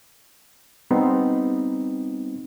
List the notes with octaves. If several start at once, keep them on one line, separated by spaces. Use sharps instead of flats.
G3 B3 C4 D#4